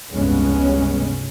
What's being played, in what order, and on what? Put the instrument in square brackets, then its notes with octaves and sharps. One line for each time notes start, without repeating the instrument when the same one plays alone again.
[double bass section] F1 C#2 G2 G#3 B3 C#4